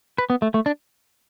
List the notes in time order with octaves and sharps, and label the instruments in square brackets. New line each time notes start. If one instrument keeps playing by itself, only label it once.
[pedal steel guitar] B4
B3
A3
A3
D4